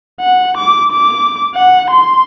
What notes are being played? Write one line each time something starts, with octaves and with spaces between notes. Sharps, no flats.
F#5
D6
D6
F#5
C6